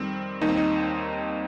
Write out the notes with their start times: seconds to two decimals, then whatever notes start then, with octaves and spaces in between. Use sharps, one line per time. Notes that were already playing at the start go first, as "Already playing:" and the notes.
Already playing: F2 D#3 G3 C4
0.41 D#2 D#3 G3 D#4
0.49 C4
0.57 D#4